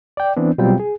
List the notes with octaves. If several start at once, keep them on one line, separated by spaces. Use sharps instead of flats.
D5 G5
E3 B3 C4 D4
B2 F#3 G3 C4 F4 G5
G#4